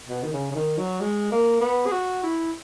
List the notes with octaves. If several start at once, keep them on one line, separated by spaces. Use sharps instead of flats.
B2
D#3
C#3
C#3
D#3
F#3
G#3
A#3
B3
G#4
F#4
E4